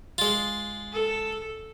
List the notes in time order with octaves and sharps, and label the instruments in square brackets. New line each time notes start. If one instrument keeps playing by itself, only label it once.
[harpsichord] G#3 F4
[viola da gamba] A4